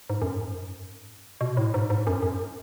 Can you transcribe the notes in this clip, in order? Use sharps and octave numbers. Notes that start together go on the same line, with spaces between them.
G#2
F#2
G#2
B2
A2
G#2
G#2
F#2
F#2